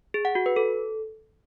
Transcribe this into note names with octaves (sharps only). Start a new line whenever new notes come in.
G#4
F#5
F#4
B4
A4